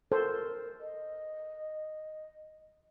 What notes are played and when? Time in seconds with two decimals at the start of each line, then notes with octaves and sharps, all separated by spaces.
0.12 A4 A#4 C5
0.81 D#5